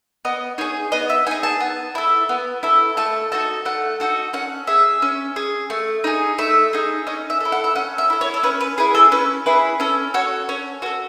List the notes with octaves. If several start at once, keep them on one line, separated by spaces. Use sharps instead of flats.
B3 D#5
D#4 G#4 C#5
B3 D#5
E5
D#4 G#4 G#5
A5
B3
E4 A4
B3
E4 A4
A3 A5
D#4 F#4 A4 A5
A3 F#5
D#4 F#4 A4
C#4 F#5
G#4 E5
C#4
G#4
A3
D#4 G#4
A3 E5
D#4 G#4
C#4 D#5
E5
E4 A4
F#5
E5
C#4 F#5
E5
E4 A4
C#5
A4
C#4 B4
B4
E4 G#4 B4
A4
C#4 B4
E4 G#4 B4
C#4 A4
F#4 A4 C#5
C#4 C#5
F#4 A4 B4